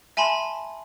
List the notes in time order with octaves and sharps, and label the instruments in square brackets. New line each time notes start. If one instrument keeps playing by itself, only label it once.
[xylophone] E5 G#5 A5 B5 C6